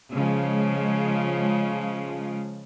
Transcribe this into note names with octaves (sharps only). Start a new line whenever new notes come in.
C#3 F3 G#3